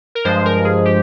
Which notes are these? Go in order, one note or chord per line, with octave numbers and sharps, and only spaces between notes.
A#4
G2 F3 G#3 C5
A#4
G#4
G4